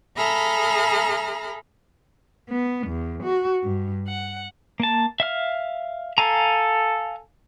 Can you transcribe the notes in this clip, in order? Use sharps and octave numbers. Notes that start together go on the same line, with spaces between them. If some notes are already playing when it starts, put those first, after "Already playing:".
G#4 A4 E5 A#5 B5 F6
B3
E2
F#4
G2
F#5
A#3 A5
E5 F5 F6
A4 F5 G#5 A#5